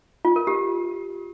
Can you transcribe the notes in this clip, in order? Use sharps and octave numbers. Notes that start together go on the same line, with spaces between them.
F4
A#4
G4